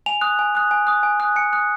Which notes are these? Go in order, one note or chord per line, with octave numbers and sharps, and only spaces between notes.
G#5 F7
D#6 F#6
G#5
D#6 F#6
G#5
D#6 F#6
G#5
D#6 F#6
G#5 C#7
D#6 F#6